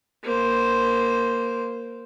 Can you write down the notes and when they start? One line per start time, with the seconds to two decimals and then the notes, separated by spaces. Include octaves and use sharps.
0.23 A#3 C5